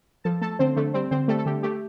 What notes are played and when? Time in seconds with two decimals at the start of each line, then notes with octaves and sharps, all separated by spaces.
0.24 F3 A4 A5
0.41 A3 A4 A5
0.59 D3 C4 C5
0.76 D3 A3 A4
0.94 G3 C4 C5
1.11 D3 C4 C5
1.28 G3 A3 A4
1.38 A4
1.46 D3 G4
1.63 A3 G4